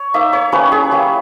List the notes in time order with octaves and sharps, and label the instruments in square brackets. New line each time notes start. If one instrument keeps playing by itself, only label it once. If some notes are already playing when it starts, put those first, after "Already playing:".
Already playing: [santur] C#5
A#3 D#4 E5
C#5
G3 A#3 C#4 E4 B4
G#4
G3 A#3 C#4 E4